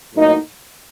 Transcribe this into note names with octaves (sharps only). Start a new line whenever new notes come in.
A2 F#3 A#3 D#4